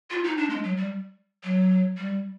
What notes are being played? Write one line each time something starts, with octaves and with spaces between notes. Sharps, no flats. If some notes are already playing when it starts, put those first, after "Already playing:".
F4
D#4
D4
G#3
F#3
G3
F#3
G3